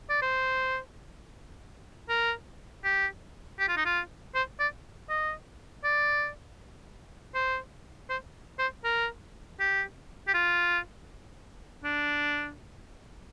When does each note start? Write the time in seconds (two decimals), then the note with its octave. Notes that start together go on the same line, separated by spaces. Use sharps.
0.10 D5
0.22 C5
2.09 A#4
2.84 G4
3.60 G4
3.68 F4
3.77 D#4
3.85 F4
4.35 C5
4.59 D5
5.09 D#5
5.84 D5
7.35 C5
8.09 C5
8.59 C5
8.84 A#4
9.60 G4
10.28 G4
10.34 F4
11.84 D4